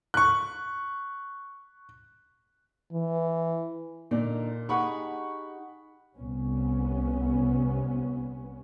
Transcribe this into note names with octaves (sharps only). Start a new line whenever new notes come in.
C#6 F#6
E3
A#2 D3 D#4 D5
D#4 G4 G#4 F#5 B5 C#6
C2 B3 C#4